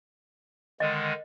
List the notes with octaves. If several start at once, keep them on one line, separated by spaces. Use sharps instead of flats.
D3 D#3 G#3 D#5